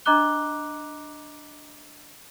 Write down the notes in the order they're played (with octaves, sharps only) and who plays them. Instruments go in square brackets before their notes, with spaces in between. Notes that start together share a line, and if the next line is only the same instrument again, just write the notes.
[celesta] D4 D#5 A#5 D6 F#6 G7